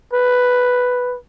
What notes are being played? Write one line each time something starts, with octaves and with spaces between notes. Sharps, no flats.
B4